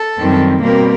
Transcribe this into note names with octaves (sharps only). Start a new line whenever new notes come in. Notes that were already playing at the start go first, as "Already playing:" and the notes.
Already playing: A4
F#2 D#3 G3 C4
B2 G3 A#3 C4 A#4